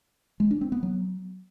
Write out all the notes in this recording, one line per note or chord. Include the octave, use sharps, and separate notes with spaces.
G#3
D4
C4
B3
F#3